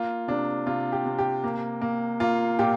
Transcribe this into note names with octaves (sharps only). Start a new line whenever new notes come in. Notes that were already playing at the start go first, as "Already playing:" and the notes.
Already playing: A#3 F4
C3 D4
C3 F4
G4
C3
G4
A#3
A#3
A#3 F4
A#2 G4